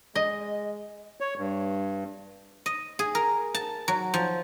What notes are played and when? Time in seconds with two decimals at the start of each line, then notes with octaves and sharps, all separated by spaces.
0.15 G#3 D#5
1.20 C#5
1.38 G2
2.66 D#5
2.99 G#4
3.15 A#4
3.54 A5
3.88 F#3
4.14 F3